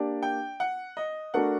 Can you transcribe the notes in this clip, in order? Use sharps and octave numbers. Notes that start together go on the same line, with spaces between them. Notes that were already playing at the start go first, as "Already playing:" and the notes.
Already playing: A#3 D4 G4 D5
G5
F#5
D#5
A3 D4 F#4 A#4 F#5